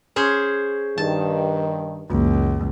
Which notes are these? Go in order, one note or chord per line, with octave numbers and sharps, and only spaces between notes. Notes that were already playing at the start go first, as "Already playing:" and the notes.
C#4 G#4 C5
G2 D#3 A5
C#2 F#2 E3 A#3